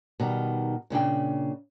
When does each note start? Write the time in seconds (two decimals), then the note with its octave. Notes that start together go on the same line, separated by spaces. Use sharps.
0.20 B2 D#3 G3
0.90 A#2 C#3 D4 G5